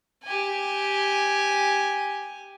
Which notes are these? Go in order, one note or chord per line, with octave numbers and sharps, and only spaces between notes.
G4 G#5